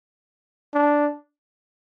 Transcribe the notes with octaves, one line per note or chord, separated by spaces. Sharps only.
D4